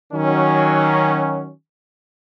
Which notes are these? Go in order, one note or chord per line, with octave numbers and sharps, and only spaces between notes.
D#3 F#3 C#4